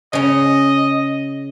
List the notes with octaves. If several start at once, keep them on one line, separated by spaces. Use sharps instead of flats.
C#3 C#4 D#5